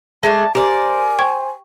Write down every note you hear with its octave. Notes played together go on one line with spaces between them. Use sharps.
G#3 A3 D4 A5
G4 A#4 C5 D5 G#5
C5 G5 C#6 G#6